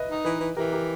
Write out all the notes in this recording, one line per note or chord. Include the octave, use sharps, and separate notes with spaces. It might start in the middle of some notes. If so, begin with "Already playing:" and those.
Already playing: B4 D#5 E5
D#4
E3 B4 D#5
E3
E3 G4 A#4
G4 A#4